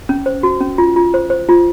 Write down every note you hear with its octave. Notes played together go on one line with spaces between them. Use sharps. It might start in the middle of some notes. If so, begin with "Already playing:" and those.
C#4
C5
F#4
C#4
F4
F4
C5
C5
F4